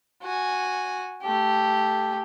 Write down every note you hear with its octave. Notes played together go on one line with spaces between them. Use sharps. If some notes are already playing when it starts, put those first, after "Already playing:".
F#4 G#5
A3 G4